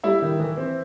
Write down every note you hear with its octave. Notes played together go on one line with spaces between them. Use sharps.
G3 E4 E5
D#3
E3
C4